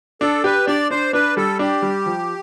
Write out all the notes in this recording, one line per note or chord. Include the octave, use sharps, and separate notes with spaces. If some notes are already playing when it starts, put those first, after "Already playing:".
D4 A4
G4 B4
D4 D5
D4 C5
D4 B4
G3 A4
D4 G4
G3
F3